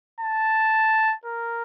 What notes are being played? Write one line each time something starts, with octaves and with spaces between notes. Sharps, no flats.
A5
A#4